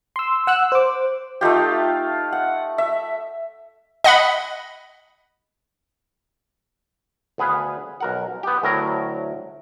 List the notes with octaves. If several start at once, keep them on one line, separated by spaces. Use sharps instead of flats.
C6 E6
F#5 E6 F#6
C5 D6
A3 D#4 F4 G4
F#5
E5
D#5 F#5 B5
D2 B3 G#4 B4 F5
B1 A#4 F#5
B3 G4
D2 A2 F#3 A#4